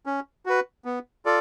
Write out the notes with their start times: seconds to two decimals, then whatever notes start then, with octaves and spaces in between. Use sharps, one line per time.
0.06 C#4
0.46 F#4 B4
0.85 B3
1.25 F4 A4 D5